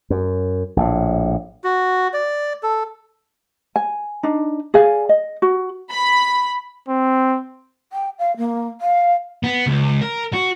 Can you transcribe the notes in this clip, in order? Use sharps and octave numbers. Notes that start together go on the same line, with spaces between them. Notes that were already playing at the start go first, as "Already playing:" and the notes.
F#2
A#1 A2
F#4
D5
A4
G#5
D4 D#4
G#4 D5 F5 G#5
D#5
F#4
B5
C4
G5
F5
A#3
F5
B3
C#2
A#4
F#4